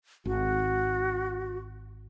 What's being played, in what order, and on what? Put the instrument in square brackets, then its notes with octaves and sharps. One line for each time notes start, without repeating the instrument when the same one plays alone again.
[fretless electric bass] G#1 [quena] F#4